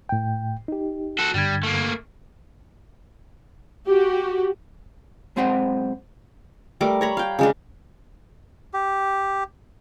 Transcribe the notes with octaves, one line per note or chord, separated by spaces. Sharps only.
A2 G5
D#4 G4
F#4 A4
G2 D3 G3 G#6
A3 A#3
F#4 G4
B1 G#3 C4 C5 F#5 C6
G3 A3 A#4 D6
C#5 A#5 B5
F5 G5
C#3 G#3 D4
G4